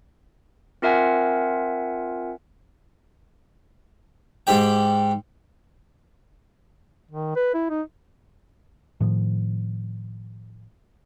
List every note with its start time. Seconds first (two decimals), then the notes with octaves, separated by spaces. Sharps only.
0.82 C4 F4 A#4 E5 F#5 G#5
4.47 G#2 G4 G5
7.11 D#3
7.36 B4
7.54 E4
7.70 D#4
9.00 A2 D#3 F3